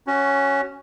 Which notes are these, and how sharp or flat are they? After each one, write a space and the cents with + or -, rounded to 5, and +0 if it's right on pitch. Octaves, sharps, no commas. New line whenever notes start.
C#4 +0 F#4 +15